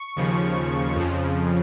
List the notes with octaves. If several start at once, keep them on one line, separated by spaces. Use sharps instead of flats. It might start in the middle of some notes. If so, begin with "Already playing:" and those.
Already playing: C#6
D#2 C#3 F3
F2 C#3 F3